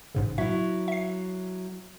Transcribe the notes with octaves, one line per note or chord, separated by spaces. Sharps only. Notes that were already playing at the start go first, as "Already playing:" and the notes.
A1 G#2 C#3
F#3 E4 E5
E5 C7